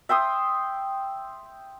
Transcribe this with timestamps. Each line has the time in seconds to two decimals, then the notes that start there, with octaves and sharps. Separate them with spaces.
0.09 E5 G5 C6 D#6